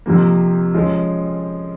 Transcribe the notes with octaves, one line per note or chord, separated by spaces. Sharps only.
F2 C3 F3 A#3
F3 G#3 C#4 F4